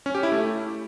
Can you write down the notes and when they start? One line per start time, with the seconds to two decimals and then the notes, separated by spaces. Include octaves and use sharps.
0.06 C#4
0.15 G4
0.23 E4
0.32 A3